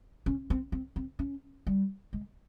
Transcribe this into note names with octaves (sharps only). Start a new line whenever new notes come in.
C#4
C4
C4
C4
C#4
G3
G#3